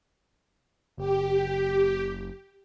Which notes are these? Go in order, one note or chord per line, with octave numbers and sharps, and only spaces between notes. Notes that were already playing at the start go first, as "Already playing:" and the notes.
F#1 G4